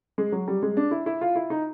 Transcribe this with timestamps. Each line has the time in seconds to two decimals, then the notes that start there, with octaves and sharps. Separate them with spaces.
0.18 G#3
0.32 F#3
0.48 G3
0.62 G#3
0.77 D4
0.91 E4
1.06 E4
1.21 F4
1.35 E4
1.50 D#4